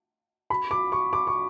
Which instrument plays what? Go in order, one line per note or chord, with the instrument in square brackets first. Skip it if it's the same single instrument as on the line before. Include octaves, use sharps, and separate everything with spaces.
[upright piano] B5
D6
C#6
D6
C#6